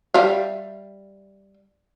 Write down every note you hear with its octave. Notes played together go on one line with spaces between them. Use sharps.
G3 E5 F5